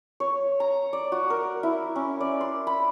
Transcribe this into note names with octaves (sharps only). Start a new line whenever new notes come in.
C#5
A#5
D5
F#4
A#4
E4
C#4
D5
C6
B5